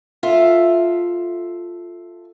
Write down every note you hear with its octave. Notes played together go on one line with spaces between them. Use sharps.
F4 A4 E5